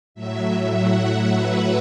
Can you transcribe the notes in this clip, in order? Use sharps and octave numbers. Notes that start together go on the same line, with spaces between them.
A2 F#3 E5
F#5
B4